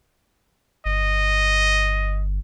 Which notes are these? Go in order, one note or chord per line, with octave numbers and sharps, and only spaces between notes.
G1 D#5